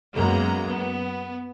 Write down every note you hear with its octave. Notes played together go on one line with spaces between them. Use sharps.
F#2 G#3 A#3 B3 A#5
B3